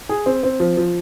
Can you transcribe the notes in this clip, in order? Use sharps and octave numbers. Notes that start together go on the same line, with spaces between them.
G#4
C4
C4
F3
F3